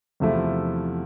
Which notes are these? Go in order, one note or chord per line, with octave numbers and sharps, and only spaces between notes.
E2 C3 F3 A3 E4